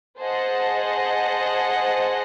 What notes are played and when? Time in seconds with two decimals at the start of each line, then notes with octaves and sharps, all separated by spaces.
0.22 G#4 C5 D#5 F#5 A5